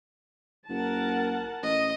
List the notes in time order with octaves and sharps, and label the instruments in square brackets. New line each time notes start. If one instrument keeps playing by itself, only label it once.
[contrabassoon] F#1 [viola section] A#4 F#5 A5
[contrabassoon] A1 [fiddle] D#5